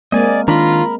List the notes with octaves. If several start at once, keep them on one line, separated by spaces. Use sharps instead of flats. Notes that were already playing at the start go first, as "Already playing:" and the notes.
G#3 A#3 C4 D5 D#5 G#5
D#3 D4 F4 A#4 A#5 B5